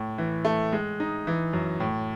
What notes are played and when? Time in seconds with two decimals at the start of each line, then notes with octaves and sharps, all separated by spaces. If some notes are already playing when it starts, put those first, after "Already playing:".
Already playing: A2
0.18 E3
0.45 A3
0.73 G#3
1.00 D#4
1.27 E3
1.53 F#2
1.80 A2